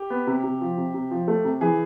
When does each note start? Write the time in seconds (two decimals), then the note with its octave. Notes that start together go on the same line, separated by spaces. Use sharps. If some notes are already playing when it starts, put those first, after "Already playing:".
Already playing: G4
0.10 B3
0.27 C3
0.44 C3
0.61 F3
0.77 C3
0.94 C3
1.11 F3
1.28 A3
1.45 C3
1.61 E3 G#4